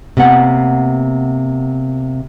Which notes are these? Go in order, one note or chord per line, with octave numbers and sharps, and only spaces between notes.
C3 A#3 B3 F#5